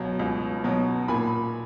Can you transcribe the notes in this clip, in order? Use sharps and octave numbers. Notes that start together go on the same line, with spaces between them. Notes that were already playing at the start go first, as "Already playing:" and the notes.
Already playing: C#2 B2 F#3
C#2
B2 F#3
A#2 G#5 B5